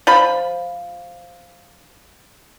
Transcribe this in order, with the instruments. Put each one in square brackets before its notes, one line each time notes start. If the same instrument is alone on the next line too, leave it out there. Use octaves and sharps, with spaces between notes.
[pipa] F3 B5